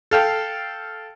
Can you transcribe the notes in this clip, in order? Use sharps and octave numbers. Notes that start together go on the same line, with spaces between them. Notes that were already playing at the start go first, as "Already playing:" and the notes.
A4 F5 G5